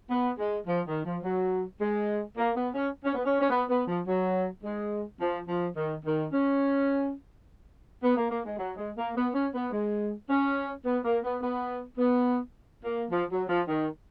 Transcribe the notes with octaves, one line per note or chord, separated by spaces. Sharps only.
B3
G#3
F3
D#3
F3
F#3
G#3
A#3
B3
C#4
C#4
B3
C#4
C#4
B3
B3
F3
F#3
G#3
F3
F3
D#3
D#3
C#4
B3
A#3
A#3
G#3
F#3
G#3
A#3
B3
C#4
B3
G#3
C#4
B3
A#3
B3
B3
B3
A#3
F3
F#3
F3
D#3